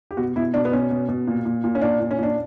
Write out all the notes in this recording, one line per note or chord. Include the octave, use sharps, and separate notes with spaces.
G4
B2 F#4
B2 E4
B2 D4
B3
B2 C#4
B2
B2
A#2
A#2
A#2
C#4
A#2 D4
A#2
C#4
A#2 D4